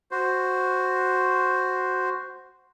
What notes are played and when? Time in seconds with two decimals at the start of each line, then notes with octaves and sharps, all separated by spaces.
0.11 F#4 C5